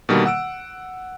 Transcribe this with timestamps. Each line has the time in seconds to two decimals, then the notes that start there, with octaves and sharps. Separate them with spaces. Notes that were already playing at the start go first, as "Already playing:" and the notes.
0.09 B2 D3 D#3 G3 A#3
0.26 F#5 E6 D7